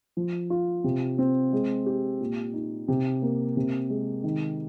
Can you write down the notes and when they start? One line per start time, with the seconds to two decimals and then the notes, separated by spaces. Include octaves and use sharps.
0.17 F3
0.50 F4
0.84 C3
1.18 C4
1.53 G#3
1.86 G4
2.20 A#2
2.54 D#4
2.88 C3
3.22 A#3
3.57 C3
3.90 G#3
4.24 D#3